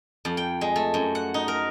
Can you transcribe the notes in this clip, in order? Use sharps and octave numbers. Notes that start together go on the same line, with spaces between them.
F2
G5
G#3
A3
F#2
F#5
D#4
A#4